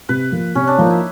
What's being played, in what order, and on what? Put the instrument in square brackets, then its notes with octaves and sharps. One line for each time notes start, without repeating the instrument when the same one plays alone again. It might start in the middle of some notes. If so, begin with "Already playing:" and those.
[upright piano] C3 [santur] B4
[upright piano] F3 A#3
[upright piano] C3 [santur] C#4
[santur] D4
[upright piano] F3 A#3 [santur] D#4
[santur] E4